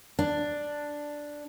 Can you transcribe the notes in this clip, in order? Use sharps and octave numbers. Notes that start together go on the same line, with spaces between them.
D4